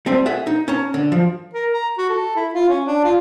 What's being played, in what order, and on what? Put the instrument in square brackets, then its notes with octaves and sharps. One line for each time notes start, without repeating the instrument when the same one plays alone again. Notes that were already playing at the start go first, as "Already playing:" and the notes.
[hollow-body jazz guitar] G3 A3 C4
G#4 A4 E5 F#5
D#4
C#4 A5 A#5
D3
F3
[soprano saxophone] A#4
A#5
F#4
A4
E4
F4
C#4
D4
F4